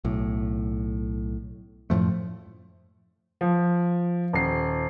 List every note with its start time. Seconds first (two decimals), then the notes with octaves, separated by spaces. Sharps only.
0.05 B1 A2
1.90 F#2 A2 F3 A3
3.41 F3
4.33 D#1 C7